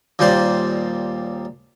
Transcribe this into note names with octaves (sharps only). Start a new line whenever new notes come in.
D#2 A#2 G3 C5 D5 C6